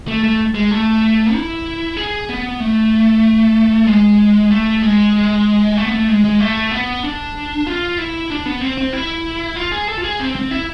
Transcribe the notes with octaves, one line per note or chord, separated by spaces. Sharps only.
A3
A3
G#3
A3
E4
G#4
B3
A3
G#3
A3
G#3
A3
B3
A3
G#3
G#3
A3
B3
D4
F4
E4
D4
B3
C4
C4
E4
F4
G#4
A4
F4
G#4
C4
C4
E4